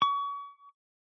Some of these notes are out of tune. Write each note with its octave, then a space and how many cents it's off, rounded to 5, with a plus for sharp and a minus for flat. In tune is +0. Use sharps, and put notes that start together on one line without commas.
C#6 +35